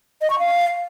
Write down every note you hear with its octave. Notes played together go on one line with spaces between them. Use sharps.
D#5
C#6
F5